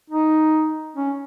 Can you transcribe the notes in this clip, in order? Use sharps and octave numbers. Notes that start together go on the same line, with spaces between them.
D#4
C#4